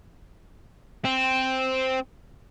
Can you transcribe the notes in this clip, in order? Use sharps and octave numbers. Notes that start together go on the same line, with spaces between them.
C4